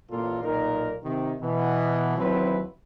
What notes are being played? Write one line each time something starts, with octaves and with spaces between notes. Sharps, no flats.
A1 A#2 A#3 F4 A4 A#4
B1 A#2 D#4 A#4
C3 D#3
B2 E3 B3
A1 D#2 F#3 C4 E4 B4